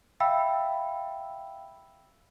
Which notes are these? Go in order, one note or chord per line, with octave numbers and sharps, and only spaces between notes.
E5 F5 G5 B5 E6